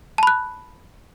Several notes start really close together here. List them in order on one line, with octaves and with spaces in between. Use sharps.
A5 B5 F#6